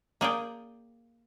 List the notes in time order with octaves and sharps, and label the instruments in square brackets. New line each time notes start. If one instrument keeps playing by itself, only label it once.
[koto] A#3 G#4 D5 G5